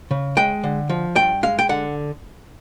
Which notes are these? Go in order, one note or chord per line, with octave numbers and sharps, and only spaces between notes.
C#3
G#3 G5
D3
F3
G2 G5
G#3 F5
G5
D3 F#5